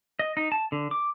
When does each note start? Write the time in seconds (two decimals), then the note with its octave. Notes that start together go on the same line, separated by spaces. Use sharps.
0.19 D#5
0.37 D#4
0.52 A5
0.72 D3
0.91 D6